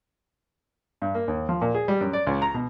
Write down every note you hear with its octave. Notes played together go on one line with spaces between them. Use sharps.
G2
A#3
D#2
F3
A#2
G#4
G3
F#2
D5
C#2
A#5
B2